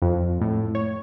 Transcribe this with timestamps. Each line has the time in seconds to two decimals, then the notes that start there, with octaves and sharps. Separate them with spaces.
0.02 F2
0.41 A2
0.75 C#5